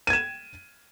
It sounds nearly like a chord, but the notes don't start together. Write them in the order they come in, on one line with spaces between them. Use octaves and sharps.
D#7 G#6 E7